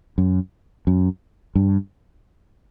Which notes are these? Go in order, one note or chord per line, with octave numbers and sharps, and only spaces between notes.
F#2
F#2
G2